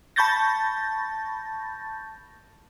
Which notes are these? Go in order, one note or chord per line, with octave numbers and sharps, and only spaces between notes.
A5 B5 C#6 G6 A6 A#6